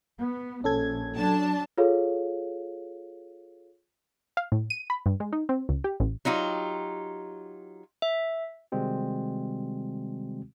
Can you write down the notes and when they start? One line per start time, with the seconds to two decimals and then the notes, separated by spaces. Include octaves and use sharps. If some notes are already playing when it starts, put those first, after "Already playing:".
0.17 B3
0.64 A#1 C#4 A4 G#6
1.17 F#3 D4 A5
1.78 F4 G#4 A4 C#5 F5
4.37 F5
4.52 A2
4.70 D#7
4.90 B5
5.06 G2
5.20 G#3
5.33 D#4
5.49 C4
5.69 C#2
5.84 G4
6.00 A1
6.25 F#3 D#4 F4 G4
8.02 E5
8.72 C3 D#3 G3 G#3 C4 F#4